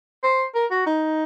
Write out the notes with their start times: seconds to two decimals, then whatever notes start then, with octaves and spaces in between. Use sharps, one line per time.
0.23 C5
0.55 A#4
0.71 F#4
0.86 D#4